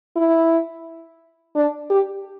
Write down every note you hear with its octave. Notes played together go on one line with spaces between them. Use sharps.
E4
D4
G4